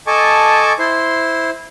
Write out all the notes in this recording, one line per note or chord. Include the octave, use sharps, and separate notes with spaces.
A4 D#5 G#5 A5 C#6 D6
E4 C5 C6